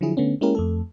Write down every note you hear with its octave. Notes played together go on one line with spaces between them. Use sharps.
D3 F3 F#3 E4 G#4
D3 A3 B3 C#4
G#3 A#3 C#4 E4 G4 A#4
F2 A3 A4